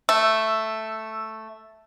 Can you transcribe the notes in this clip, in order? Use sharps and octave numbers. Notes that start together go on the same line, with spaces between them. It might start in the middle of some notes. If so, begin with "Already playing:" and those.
A3 E6